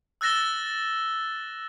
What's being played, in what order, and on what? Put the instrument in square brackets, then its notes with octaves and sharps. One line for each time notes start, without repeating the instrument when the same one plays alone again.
[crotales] E6 F#6 A6 A#6 E7 G7